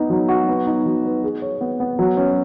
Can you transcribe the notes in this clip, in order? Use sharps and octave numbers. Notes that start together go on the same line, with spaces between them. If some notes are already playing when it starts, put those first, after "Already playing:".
Already playing: B3 D#4
F#3
F#4
B3
D#4
F#3
B4
G#4
C#5
B3
B3
F#3
C#4